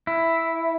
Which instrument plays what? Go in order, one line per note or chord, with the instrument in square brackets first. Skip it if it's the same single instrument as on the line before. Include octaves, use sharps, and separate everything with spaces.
[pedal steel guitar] E4